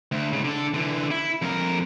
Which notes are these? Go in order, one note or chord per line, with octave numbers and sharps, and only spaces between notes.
D2
G#2 C#3
D3 A4
D3 E3
E4
F2 A#4